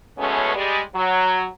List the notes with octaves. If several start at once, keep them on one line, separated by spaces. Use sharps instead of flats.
B2 G#3 A3 B3 C#4
G3 G#3 D5
F#3